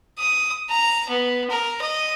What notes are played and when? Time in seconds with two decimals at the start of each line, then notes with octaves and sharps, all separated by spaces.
0.18 D#6
0.69 A#5
1.09 B3
1.50 A#4
1.81 D#5